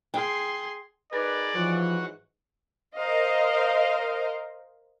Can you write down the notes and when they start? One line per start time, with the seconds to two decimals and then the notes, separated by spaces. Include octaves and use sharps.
0.14 G#4 G5 C6
1.13 D#4 G#4 A#4 B4 D5
1.55 G#2 E3 F3 F#4 C#5
2.97 A#4 C5 D#5 F5